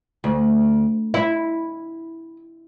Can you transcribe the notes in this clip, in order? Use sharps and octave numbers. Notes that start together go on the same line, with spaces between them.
D2
E4